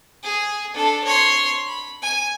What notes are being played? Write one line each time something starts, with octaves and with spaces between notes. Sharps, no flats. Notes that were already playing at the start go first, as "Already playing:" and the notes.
G#4
D4 A4
C#5 C6
B5
G#5